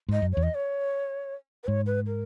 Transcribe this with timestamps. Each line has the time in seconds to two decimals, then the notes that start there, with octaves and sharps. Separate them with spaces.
0.09 G#2 D#5
0.22 F#2
0.33 E2 C#5
0.43 D#5
0.55 C#5
1.64 B4
1.67 G#2 C#5
1.86 B4
2.07 A#4